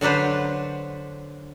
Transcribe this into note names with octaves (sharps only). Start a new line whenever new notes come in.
D3 F#3 D4 B4 C5